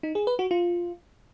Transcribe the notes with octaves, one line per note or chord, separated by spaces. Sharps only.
D#4
G#4
B4
F#4
F4